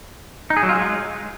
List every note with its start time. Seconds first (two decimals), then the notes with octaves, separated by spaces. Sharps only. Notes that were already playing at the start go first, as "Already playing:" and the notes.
0.50 D#4
0.57 G#4
0.63 F#3
0.69 F4
0.75 G#3